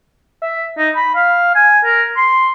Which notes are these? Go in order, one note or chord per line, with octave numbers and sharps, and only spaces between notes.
E5
D#4
B5
F5
G#5
A#4
C6